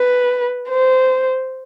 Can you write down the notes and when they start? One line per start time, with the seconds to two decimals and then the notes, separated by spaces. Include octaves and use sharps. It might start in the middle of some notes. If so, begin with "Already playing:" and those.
Already playing: B4
0.69 C5